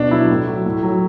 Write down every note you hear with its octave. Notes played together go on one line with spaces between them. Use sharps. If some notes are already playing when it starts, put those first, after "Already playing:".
Already playing: B2 D4
F#3 E4
A2
F#3
A2
F#3